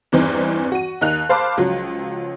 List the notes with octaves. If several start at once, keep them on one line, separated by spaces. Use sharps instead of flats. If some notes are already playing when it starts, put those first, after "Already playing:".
E2 G2 E3 C4 D#4
F#4 D#7
D#2 D#4 F#6 F7
C5 F5 A5 B5 C6 D6
C#2 F3 F#3